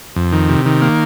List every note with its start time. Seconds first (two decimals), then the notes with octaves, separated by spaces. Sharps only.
0.16 F2
0.32 D#3
0.49 C3
0.66 D#3
0.82 A#3